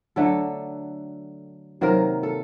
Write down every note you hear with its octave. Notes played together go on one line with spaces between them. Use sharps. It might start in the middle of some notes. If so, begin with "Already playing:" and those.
D3 F#3 A3 A4
C3 D#3 F#3 A#3 A#4
A4